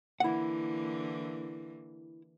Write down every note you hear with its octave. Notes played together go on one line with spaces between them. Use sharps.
D3 E3 A#3 E4 F#5